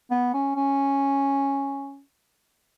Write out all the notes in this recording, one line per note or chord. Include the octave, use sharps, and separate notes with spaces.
B3
C#4
C#4